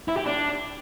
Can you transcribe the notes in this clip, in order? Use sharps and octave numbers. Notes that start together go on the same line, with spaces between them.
E4
G4
D4